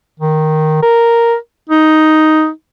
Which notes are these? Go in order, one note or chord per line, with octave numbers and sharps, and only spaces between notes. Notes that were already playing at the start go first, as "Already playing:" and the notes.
D#3
A#4
D#4